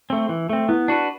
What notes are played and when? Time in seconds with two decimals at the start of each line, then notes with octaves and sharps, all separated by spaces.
0.10 A3 C4
0.29 E3
0.49 A3 C4
0.69 B3 E4
0.88 D4 F#4 B4